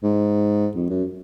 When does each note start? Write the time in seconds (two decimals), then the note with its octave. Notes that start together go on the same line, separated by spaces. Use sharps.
0.03 G#2
0.75 F2
0.90 F#2